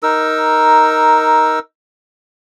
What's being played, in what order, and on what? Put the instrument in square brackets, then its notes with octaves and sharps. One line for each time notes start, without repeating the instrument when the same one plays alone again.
[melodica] D#4 A#4 E6